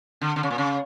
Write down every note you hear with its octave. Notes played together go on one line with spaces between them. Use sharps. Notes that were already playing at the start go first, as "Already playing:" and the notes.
D3
D3
C#3
A#2
C#3